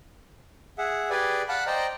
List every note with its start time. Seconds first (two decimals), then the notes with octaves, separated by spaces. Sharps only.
0.78 G#4 E5 F#5
1.10 G4 G#4 B4 D5 G#5
1.49 F5 F#5 A5 B5 F#6
1.67 C5 D5 D#5 G5 A#5